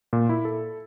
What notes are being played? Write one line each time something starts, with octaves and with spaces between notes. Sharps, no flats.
A#2
E4
A4